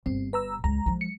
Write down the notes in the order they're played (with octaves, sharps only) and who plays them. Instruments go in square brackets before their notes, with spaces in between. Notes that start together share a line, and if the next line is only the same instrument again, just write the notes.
[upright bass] G1 [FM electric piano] C4
[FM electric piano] B4 A#5 E6
[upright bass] C#2 [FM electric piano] A#5
[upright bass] F3 G#3
[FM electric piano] C#7